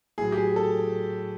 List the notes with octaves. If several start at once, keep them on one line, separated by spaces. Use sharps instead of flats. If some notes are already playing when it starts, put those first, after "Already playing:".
A2 F#3 G#4
G4
G#4
A4